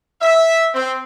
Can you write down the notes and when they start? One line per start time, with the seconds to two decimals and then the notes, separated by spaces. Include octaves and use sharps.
0.22 E5
0.74 C4